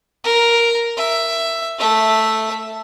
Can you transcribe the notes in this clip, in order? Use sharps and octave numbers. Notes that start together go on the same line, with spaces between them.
A#4
E5
A3 E5